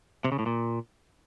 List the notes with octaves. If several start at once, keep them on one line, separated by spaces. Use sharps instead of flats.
C3
C#3
A2
A#2